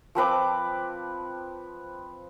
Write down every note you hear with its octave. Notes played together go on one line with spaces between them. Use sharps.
F3 C4 B4 D6